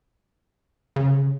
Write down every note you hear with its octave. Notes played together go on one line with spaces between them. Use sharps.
C#3